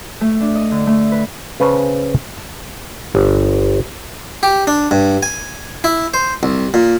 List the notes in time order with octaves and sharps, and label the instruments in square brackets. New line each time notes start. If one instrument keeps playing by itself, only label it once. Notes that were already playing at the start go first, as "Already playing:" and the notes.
[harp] A3
D4
D#5
D3
A3
B4
[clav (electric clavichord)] C#3 C#4 B4 C5 A5
A5
G1
[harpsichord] G4
D4
G2
G#5
E4
C5
C2
A#2